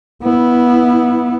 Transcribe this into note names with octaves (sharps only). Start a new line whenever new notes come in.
B3 E4